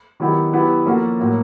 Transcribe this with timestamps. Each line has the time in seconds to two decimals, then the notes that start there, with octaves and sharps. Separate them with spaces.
0.20 D#3 F#3 B3 E4 G4
0.53 F#3 B3 E4 G4 B4
0.85 F3 A#3 C#4 F#4 A4
1.20 A2 F#3 A#3